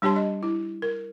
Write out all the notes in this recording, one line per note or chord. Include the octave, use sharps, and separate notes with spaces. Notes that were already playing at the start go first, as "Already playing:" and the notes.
G3 D4 G4 C#5 A5 C6
D#5
E4
A#4